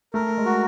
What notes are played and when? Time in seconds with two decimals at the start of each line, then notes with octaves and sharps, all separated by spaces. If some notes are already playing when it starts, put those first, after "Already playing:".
0.14 A3 A#4
0.38 G#3
0.46 F#4